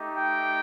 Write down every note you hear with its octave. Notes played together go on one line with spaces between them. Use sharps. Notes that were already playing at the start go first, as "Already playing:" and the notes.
Already playing: A3 D#4 G4
G5